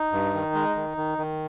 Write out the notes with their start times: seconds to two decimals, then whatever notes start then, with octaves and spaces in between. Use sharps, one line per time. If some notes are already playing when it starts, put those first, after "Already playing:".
Already playing: D#4
0.12 G2
0.34 D#3
0.55 G#3
0.76 D#3
0.97 D#3
1.18 D#3